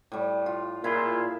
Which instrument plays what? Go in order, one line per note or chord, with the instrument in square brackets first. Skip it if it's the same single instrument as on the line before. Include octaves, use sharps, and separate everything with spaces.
[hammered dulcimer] A2 G3
F4
[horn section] A#2 F4 G#4 [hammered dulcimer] E4